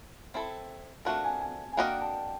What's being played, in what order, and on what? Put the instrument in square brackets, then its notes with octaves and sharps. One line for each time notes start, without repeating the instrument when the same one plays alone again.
[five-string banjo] C4 E4 A4
[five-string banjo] F3 A3 D4 F#4 A#4 [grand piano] A5
[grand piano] G#5
G#5
G#5
[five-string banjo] A#3 D4 F#4 A#4 D#5 [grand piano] G5
[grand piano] A5